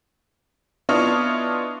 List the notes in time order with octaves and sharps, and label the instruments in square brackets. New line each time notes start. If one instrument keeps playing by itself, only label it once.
[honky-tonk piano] B3 D4 E4 F4 C#5 D#5